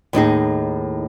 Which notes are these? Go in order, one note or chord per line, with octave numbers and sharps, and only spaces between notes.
D#2 A2 D#4 G#4